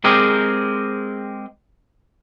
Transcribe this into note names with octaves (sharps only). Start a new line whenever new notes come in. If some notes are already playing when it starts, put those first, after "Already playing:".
G#3 C4 G4 G#4 A#4 C5